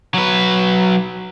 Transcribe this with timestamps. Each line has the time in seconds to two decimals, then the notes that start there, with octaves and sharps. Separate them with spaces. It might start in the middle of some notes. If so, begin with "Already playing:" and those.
0.14 F#3 B4